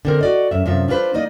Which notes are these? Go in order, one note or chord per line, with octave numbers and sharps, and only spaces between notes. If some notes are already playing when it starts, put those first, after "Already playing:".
D3 C4 A#4
F#4 D5 D#5
F#2 E5
F#2 C3 F3 E5
D4 F4 F#4 B4 C5
A#3 D#4 D5 D#5